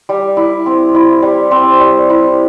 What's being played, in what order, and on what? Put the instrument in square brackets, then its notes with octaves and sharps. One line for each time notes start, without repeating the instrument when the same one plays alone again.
[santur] G3
E4
C4
E4
G3
C4
G3
E4